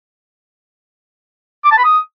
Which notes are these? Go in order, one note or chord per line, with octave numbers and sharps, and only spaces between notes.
D6
A5
B5
D#6